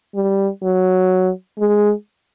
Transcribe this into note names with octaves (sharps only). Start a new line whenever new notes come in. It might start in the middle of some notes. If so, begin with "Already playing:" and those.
G3
F#3
G#3